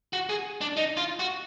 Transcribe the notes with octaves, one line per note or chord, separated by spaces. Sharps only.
F#4
G#4
D4
D#4
F4
F#4